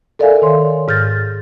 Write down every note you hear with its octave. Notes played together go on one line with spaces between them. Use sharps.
A4 A#4 D5 E5 F5 G#5
D#3 C#5 C6
G#2 F6 G6 A6 A#6